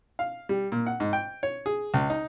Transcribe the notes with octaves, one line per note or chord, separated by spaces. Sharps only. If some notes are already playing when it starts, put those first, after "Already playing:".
F5
G3
A#2
F#5
G#2
G5
C#5
G#4
C#2
D#4